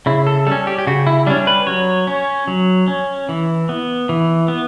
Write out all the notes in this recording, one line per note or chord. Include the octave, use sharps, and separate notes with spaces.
C#3 E4
A4
G3 C#4 A4
G4
G4
C#3 F#4
E4
G3 C#4 D4
B4
F#3 C#5
C#4
F#3
C#4
E3
B3
E3
B3